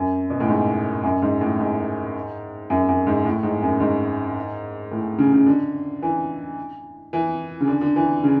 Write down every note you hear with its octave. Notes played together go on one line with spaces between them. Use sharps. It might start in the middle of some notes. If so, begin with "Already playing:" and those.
Already playing: F#2
B2
A2
G#2
F#2
G#2
A2
G#2
F#2
F#2
G#2
A2
G#2
F#2
G#2
A2
C#3
C#3
D3
E3
E3
C#3
D3
D3
E3
C#3